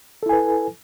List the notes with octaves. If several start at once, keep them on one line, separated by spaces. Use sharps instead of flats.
E4 A4 B4 G#5